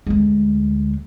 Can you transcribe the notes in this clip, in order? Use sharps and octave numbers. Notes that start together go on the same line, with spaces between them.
D2 G#3